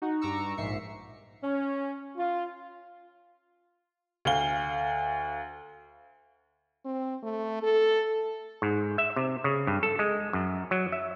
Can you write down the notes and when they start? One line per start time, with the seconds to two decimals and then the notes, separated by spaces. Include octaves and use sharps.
0.02 D#4 F#4
0.21 G2 A#5 C#6 D6 E6 C#7
0.57 A#1 G#2 E5 C7 C#7
1.44 C#4
2.17 F4
4.25 D2 F5 G7
6.85 C4
7.23 A3
7.63 A4
8.62 G#2
8.98 E5
9.16 C3
9.44 C#3
9.67 G2
9.83 A4
9.99 G#3
10.33 F#2
10.71 F#3
10.92 E5